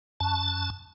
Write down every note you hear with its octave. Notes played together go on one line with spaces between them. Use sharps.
F#2 A5